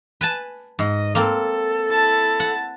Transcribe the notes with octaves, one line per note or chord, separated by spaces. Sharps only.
B4 G#5 A5
G#2 D#5
A#3 C4 A4
E4 A5
F#5